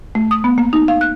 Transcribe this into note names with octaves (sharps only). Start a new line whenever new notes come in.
A3
D#6
B3
A#3
D#4
F5
F#6